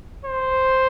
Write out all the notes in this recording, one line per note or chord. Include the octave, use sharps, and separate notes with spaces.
C5